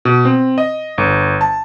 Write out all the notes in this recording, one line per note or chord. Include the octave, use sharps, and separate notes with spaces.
B2
C4
D#5
G1
A5